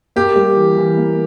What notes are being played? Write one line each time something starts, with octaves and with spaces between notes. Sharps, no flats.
A#3 G4
G3
E3
E3
A#3